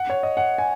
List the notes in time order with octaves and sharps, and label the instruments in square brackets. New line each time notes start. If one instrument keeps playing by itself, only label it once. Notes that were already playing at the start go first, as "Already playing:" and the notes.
Already playing: [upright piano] F#5
C#5
D#5
F#5
G#5